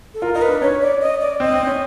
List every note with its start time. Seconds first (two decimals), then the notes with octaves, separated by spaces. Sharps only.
0.14 A4
0.22 F4 A#4
0.34 D#4 A#4
0.42 B4
0.49 D4
0.62 C#4 C#5
0.81 D5
1.01 D#5
1.21 D5
1.40 C4 D#5
1.54 C4
1.67 C#4